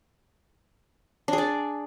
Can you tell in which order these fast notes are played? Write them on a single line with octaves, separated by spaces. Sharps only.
D4 G#4 D5